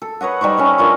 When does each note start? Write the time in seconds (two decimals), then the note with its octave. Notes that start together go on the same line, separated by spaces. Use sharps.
0.02 A4
0.21 B4 C#5 D#5 F#5
0.41 G3 D#4 C5 C#5
0.58 C#4 B4 E5
0.78 D4 F4 A#4